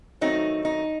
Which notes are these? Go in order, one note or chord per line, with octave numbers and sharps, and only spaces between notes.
D#3 F#3 A3 C4 D#4
D#4